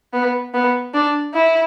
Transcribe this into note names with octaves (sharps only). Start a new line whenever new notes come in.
B3
B3
D4
E4